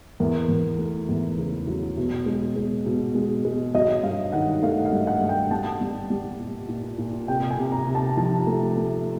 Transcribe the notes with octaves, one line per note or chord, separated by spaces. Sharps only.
E2 A#4
E2
A3
E2
C#3
F#3
B2
G#3
G#3
B2
G#3
G#3
F#3 D#5
G2 F5
D#3 F#5
A3 F5
F5
G2
F#5
G2
G5
G3 A5
G3
G3
A#2
A#2
A#2
C3 G5
G#5
C3
A#5
C3
A5
F3 A5
A3
A3